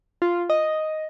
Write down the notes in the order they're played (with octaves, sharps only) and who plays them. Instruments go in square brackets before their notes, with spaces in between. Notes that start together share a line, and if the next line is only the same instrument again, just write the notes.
[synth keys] F4
D#5